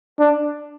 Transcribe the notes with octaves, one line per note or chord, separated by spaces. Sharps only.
D4